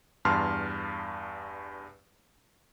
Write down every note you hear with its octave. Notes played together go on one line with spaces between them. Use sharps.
E2 G2 A5 C6 F6